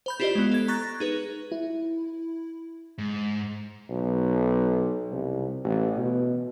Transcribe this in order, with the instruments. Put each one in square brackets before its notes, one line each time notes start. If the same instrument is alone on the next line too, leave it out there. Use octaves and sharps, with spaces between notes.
[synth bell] C5 B5 G6
E4 F4 G4 C5 D5 D#5
G#3 B3
A4 G#6
A#5 C#6 F#6 A6 A#6
D#4 G#4 B4
[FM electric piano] E4
[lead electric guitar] G#2
[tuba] B1
C2
A1
B2